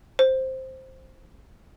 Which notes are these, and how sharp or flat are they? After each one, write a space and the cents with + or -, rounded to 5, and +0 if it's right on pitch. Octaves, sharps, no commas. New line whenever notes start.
C5 +5